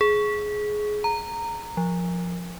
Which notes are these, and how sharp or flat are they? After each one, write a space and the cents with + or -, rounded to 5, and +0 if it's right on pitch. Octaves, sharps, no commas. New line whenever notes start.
G#4 +15
A#5 -15
F3 +10